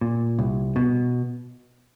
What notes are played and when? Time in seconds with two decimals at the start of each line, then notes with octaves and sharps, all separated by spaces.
0.01 A#2
0.39 C2
0.76 B2